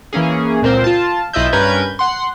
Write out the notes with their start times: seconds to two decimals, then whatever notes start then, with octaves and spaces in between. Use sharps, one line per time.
0.13 E3 A#3 C#4 G#4
0.62 C#2 A#2 C4 A#4 C5
0.84 F4 A5
1.33 B1 E4 F4 D#5 E5 G6
1.53 G2 C#4 A#4 B4 G6 G#6
1.99 F#5 C6